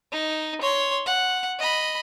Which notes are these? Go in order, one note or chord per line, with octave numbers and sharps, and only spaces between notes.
D#4
C#5 C6
F#5
D#5 B5